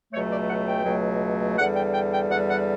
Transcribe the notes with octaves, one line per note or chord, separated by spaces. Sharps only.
C#2 B2 F#3 A3 C#5
D5
F#5
G5
C#2 B2 F#3 A3
E2 D3 G3 F#5
G5
G5
G5
E2 D3 G3 F#5
F#5